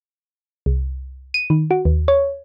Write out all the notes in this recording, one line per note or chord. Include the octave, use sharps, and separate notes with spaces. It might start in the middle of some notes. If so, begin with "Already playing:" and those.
C2
D#7
D#3
F#4
D#2
C#5